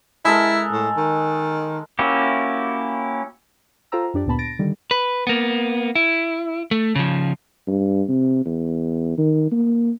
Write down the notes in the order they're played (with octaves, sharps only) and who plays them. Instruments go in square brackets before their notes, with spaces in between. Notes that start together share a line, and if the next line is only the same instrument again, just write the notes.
[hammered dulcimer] G#3 A4 A#4 [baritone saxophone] E4
[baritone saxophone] A2
D#3
[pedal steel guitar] A#3 C#4 E4 F#4 G4
[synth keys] F4 A4 C5 G5 A#5 E6
F#2 D4 G4 D5
D2 A#2 B3 A5 B5
A6 A#6 D7
D3 D#3 G3
[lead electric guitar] B4
A#3 B3
E4
A3
C#3 F3
[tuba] G2
C3
E2
D#3
A#3